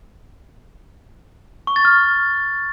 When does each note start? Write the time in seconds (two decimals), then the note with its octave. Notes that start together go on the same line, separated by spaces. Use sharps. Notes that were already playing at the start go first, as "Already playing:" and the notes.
1.67 C#6
1.76 A6
1.85 F6